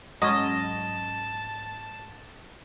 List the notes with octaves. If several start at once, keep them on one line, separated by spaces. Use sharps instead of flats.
G#2 F#3 G#3 C#4 D#5 A5